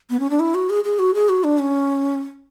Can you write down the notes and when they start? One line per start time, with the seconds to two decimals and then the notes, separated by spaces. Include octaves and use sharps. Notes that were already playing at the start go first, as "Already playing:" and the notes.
0.10 B3
0.20 C#4
0.30 D4
0.40 E4
0.55 F#4
0.70 G#4
0.84 G#4
0.99 F#4
1.14 G#4
1.29 F#4
1.44 D4
1.59 C#4